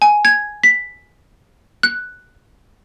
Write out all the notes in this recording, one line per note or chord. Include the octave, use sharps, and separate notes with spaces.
G#5
G#6
B6
F#6